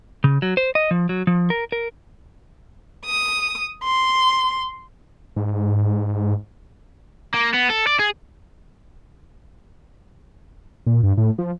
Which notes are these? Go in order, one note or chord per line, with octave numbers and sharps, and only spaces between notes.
C#3
F#3
C5
D#5
F3
F#3
F3
A#4
A#4
D#6
C6
G#2
A#3
B3
A4
D5
G#4
A#2
G2
A2
F3